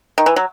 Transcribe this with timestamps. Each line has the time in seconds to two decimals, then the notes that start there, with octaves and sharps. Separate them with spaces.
0.18 D#3
0.26 E3
0.36 F#3